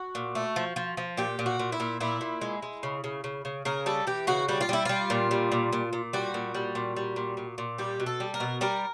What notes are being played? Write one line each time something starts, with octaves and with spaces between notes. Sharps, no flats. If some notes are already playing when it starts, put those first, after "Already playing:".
Already playing: F#4
A#2
A3
F3
F3
F3
A#2 G4
A#2
F#4
A#2
E4
A#2
A#2 E4
A#2
G#3
G#3
C#3
C#3
C#3
C#3
C#3 A#4
G3 A4
E3 G4
C#3 F#4
G3 F#4
F4
G3 E4
G3 F4
A#2
G3
A#2
A#2
A#2
G3 F#4
A#2
G3
A#2
G3
A#2
A#2
A#2
G3 G4
B2
A4
G3
A#4
B2
G3 A#4